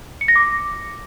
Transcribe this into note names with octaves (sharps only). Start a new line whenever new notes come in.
C#7
A#6
D6